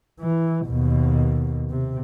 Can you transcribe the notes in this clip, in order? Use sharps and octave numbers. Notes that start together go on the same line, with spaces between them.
E3
D#2 B2
C3